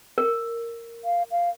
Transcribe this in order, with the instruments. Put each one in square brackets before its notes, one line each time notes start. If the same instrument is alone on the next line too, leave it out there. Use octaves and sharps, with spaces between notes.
[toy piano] A#4
[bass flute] F5
F5